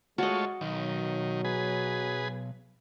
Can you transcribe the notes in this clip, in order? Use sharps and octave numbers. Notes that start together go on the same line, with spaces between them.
G#3 A3 F4 F#4 C#5 D#5
B1 D#3 F#3
G#4 B4